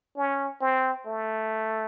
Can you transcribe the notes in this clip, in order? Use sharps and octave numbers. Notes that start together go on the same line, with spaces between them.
C#4
C4
A3